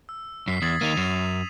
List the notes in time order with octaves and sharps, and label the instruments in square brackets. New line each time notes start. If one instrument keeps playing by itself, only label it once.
[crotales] E6
[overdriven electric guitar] F#2 [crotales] B6 C7
[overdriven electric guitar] E2 [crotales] D#6 G#6 A6
[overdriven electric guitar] D#3 A#3 [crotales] D#7 F7
[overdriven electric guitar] F#2 [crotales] C7 E7